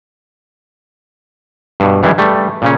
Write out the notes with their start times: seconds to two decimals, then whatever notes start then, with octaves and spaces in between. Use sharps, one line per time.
1.80 G2 B2
2.03 F#2 E3 G3 G#3
2.18 G3 A3
2.62 A#2 C#3 C#4